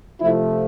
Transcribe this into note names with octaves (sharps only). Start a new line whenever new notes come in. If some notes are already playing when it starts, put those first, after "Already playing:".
C3 F3 A3 E4